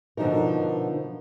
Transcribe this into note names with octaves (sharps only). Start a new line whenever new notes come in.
B2 D3 F3 D4 D#4 A#4